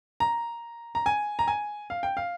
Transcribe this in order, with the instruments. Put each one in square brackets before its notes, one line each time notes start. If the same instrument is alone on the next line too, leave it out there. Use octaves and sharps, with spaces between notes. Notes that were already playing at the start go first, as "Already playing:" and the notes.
[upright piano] A#5
A#5
G#5
A#5
G#5
F5
G5
F5